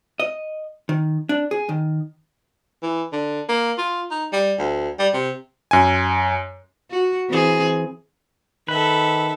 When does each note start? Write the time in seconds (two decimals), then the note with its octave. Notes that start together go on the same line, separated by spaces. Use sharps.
0.20 D#5
0.89 D#3
1.29 D4
1.51 G#4
1.69 D#3
2.83 E3
3.13 D3
3.49 A#3
3.78 F4
4.11 D#4
4.33 G3
4.59 D2
4.99 G3
5.14 C3
5.71 F#2 G#5
6.90 F#4
7.29 E3 C4 G#4
8.68 D#3 A4 B4 E5